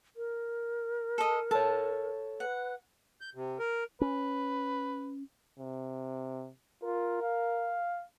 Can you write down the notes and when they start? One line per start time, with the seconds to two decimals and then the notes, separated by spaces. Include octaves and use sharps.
0.17 A#4
1.18 A4 D#5
1.51 A4 C#5 A5
2.40 B4 F#5
3.21 G6
3.35 C3
3.59 A#4
4.01 C#4 B4
5.59 C3
6.83 F4 A#4
7.23 F5